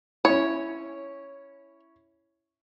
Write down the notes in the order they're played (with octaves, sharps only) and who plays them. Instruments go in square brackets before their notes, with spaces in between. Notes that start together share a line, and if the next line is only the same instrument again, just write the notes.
[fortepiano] C#4 E4 [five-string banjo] C#5